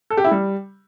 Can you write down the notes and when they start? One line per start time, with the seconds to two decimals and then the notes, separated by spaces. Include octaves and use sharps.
0.10 A4
0.17 G4
0.24 E4
0.31 G3